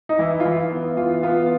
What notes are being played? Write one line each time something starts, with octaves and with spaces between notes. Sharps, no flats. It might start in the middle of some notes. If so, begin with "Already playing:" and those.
D#4
E3 E4
F4
E3 E4
B3
E3 F4
B3 F4